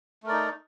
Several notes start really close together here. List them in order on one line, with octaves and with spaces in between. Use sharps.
A3 A#4 D5 D#4